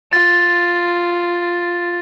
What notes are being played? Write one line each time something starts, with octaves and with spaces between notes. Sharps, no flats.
F4 A6